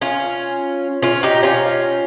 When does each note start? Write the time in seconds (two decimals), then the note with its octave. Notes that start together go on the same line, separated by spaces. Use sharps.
0.02 C#4 F4
1.02 C#4 F4
1.23 D#4 G4
1.43 C#4 F4